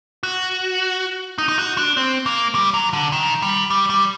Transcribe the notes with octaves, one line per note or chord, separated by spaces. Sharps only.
F#4
D#4
D#4
F#4
D4
C4
A#3
G3
F#3
D3
D#3
G3
G3
G3